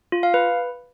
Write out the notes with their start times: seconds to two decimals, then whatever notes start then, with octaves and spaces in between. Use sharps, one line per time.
0.12 F4
0.23 F5
0.34 B4